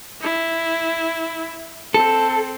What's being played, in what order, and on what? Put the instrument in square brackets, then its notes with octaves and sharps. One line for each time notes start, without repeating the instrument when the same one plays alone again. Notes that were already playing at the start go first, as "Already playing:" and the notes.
[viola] E4
[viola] C4 [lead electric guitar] A4